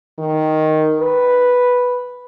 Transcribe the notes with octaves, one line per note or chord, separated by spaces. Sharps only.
D#3
B4